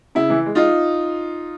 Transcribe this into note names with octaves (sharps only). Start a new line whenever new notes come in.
C#3 E4
E3
G#3
D#4 F4